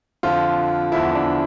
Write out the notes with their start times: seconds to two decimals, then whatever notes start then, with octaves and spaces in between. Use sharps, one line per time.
0.23 F2 D3 F3 F4
0.92 E2 D3 F3 E4
1.15 D4